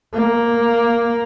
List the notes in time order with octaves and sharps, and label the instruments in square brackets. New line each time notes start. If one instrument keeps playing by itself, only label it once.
[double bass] A#3